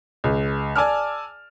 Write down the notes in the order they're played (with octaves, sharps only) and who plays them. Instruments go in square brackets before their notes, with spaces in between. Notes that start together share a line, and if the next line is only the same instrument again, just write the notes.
[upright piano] C#2
D5 G#5 A5 D6 E6 F6